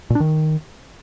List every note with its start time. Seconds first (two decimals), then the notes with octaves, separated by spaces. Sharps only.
0.10 A#2
0.15 D4
0.20 D#3